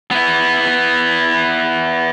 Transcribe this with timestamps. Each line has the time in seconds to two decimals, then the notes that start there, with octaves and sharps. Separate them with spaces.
0.11 B3 E4